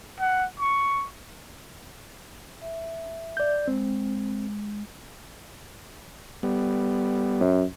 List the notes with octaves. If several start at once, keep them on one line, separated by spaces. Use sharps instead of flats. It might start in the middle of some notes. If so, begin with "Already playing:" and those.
F#5
C#6
E5
D5 G6
G#3 C4
G3 B3
F#2